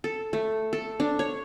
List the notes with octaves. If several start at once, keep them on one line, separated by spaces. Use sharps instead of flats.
A4
A3
A4
D4
C#5